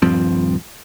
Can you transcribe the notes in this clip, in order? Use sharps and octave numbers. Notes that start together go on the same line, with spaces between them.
D#1 G2 F3 C4